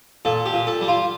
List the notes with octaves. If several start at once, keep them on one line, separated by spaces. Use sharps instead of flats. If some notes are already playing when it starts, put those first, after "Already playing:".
A#2 A4
G4
A#2
A4
G3
F4